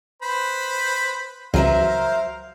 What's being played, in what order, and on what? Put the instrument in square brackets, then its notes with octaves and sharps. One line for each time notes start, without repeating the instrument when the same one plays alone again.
[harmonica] B4 C5 B5
[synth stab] C#2 [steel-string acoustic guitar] F#3 A#4 E5 [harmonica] C5 F5